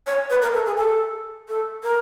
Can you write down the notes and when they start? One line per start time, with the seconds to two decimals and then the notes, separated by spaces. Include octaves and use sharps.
0.06 C#5
0.30 B4
0.42 A#4
0.54 A4
0.66 G#4
0.77 A4
1.48 A4
1.83 A#4